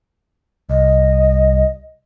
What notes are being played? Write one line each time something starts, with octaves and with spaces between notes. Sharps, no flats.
C2 D#5